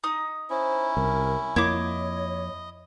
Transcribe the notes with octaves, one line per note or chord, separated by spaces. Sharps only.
D#4 D#6
C#4 E4 C5
C2 A#4
F2 A#3 E4 C#5 D#5 D6